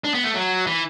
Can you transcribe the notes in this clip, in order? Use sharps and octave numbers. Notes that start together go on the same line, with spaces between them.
D4
B3
A3
F#3
E3